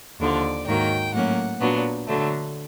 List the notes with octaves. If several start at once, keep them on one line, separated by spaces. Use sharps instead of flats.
D#2 D3 F3 D5
G#2 D#3 F#3 A#3 G5
A2 F#3 A#3 C#4 F#5
A#2 F#3 B3 D4
D3 F#3 A3